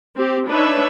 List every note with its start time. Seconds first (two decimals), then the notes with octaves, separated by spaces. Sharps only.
0.16 C4 G4
0.48 D4 D#4 B4 C#5 E5